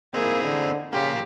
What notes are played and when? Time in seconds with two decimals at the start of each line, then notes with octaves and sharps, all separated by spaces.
0.14 A#3 C4 D#4 E4 G#4
0.43 D3
0.93 C#3 F3 A#3 G4